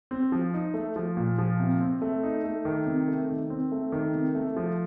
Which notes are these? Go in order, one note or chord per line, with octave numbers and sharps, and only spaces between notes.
C4
F3
D#4
A3
F3
A#2
F3
C3
C4
A3
D#4
A3
D#3
C3
A3
D#3
C4
A3
D#3
C3
A3
F3